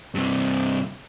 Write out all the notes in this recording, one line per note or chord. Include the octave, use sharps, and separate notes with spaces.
G2 C3